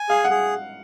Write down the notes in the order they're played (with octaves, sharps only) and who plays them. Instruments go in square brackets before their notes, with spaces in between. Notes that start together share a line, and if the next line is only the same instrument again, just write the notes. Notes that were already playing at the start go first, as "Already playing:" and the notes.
Already playing: [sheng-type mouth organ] G#5
[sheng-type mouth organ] G#4 [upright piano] F5
[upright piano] F#5
[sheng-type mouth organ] G#4